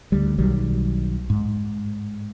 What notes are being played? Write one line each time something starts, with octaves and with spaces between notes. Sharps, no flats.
D2 G3
B1 D#3 F#3 G3
G#2